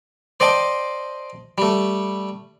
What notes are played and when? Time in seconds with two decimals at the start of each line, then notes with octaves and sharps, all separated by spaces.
0.40 C5 D5 D#5 F5 G5 A5
1.58 G3 A3